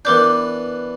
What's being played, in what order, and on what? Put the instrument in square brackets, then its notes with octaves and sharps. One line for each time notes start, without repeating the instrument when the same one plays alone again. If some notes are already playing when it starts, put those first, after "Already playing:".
[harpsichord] E3 B3 D4 [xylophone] A#4 D6 G6